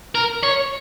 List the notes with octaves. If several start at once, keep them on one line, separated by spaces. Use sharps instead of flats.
A#4
C#5